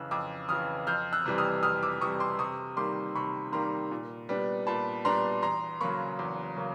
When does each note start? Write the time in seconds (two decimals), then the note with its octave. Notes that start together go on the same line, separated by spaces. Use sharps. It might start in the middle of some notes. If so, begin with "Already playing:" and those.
Already playing: F2 C#3 E3 E6 F#6
0.11 F2 D6 E6
0.49 C#3 E3 D#6 F6
0.87 F2 F6 G6
1.13 E6 F#6
1.26 C3 E3 G3
1.38 D#6 F6
1.63 F2 D#6 F6
1.83 D6 E6
2.01 C3 E3 G3 C#6 D#6
2.20 C6 D6
2.39 C3 C#6 D#6
2.77 D#3 G3 A#3 C6 D6
3.15 C3 B5 C#6
3.52 D#3 G3 A#3 A#5 C6
3.91 A#2
4.29 G3 B3 D4
4.67 A#2 A5 B5
5.05 G3 B3 D4 A#5 C6
5.42 E2 A#5 C6
5.81 C#3 F#3 A#3 B5 C#6
6.19 E2
6.56 C#3 F#3 A#3